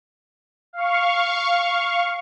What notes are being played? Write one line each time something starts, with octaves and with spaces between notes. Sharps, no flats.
F5 C#6